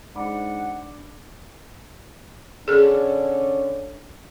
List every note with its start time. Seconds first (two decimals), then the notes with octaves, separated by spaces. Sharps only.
0.15 G#2 D4 F#5 B5 D6
2.68 D3 C#4 D4 G#4 A4